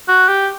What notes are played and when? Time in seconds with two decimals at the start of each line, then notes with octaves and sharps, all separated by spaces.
0.08 F#4
0.28 G4